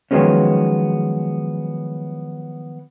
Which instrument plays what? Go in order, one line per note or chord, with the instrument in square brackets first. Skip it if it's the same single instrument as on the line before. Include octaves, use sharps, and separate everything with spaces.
[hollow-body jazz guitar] D#3 F3 F#3 G#3 B3 C#4